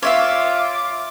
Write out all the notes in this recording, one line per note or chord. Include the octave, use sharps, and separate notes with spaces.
F4 C#5 E5 F5 D6